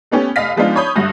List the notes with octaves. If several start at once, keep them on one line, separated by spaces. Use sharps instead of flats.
A3 B3 C#4 G4
F1 D#5 F5 B6
F3 G#3 B3 D4 D#4 F4
C#5 B5 D#6 G6
G1 G2 F#4 A#6